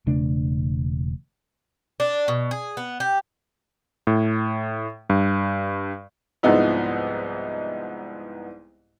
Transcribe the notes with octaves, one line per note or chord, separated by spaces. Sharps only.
E1 C#3 A3 D4
D4
B2
G#4
B3
G4
A2
G2
C2 G#2 F3 B3 D#4 E4